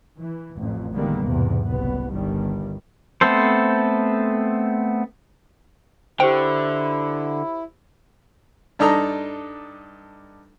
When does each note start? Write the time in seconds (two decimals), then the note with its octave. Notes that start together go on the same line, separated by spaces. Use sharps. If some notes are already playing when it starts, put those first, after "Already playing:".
0.19 E3
0.57 A1 F2
0.94 D3 D#3 G3 G#3 A#3 B3
1.25 B1 E2 G#2 C3
1.65 F#1 C2 B3
2.12 G1 D#3 G3
3.21 A3 B3 C4 A4 C5
6.20 D3 E4 G4 C5 G5
8.79 G2 D4 D#4 A4 A#5